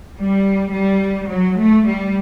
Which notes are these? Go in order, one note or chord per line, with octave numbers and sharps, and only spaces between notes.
G3
G3
F#3
A3
G3